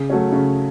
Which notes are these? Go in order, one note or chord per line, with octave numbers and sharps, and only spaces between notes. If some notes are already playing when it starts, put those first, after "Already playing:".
Already playing: C#3 G#4
F#3 A3 C#4
C#3